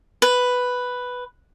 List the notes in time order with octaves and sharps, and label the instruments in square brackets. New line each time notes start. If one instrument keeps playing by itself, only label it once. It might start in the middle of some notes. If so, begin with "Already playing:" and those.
[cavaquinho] B4